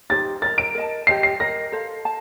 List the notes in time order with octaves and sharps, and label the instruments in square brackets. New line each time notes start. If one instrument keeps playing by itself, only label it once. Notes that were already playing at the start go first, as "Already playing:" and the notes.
[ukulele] D#4 G4 C5 [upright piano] A6
[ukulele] A#4 D#5 A#5 [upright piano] A6
[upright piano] D7
[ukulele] A#4 D#5 A5
[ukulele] G4 C5 D#5 [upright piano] C7
[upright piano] C7
[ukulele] A#4 D#5 A#5 [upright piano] A#6
[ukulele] A4 C5 F5
A5